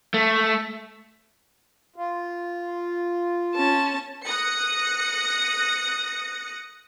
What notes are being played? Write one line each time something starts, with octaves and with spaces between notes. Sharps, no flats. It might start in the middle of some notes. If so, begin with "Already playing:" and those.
A3
F4
C#4 A5
D#6 F#6 A#6 C#7